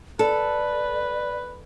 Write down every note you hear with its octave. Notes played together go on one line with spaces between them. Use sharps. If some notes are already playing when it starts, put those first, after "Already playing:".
A4 B4 D5